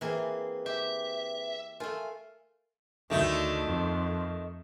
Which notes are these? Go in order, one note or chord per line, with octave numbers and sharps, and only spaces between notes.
E3 A#3 C4 G#4 B4
G4 E5
A3 F4 A#4 G#5
D2 D#3 A3
F2